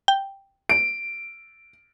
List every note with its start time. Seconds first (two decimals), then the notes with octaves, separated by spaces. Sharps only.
0.08 G5
0.69 D7